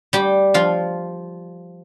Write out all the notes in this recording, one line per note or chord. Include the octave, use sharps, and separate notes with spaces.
G3 G4
F3 F4